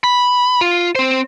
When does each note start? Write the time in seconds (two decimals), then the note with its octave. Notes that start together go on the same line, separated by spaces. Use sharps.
0.04 B5
0.61 F4
0.95 C4 C5